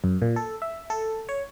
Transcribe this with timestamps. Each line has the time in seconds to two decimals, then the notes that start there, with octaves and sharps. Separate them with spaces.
0.04 F#2
0.22 A#2
0.36 A4
0.62 E5
0.90 A4
1.29 C#5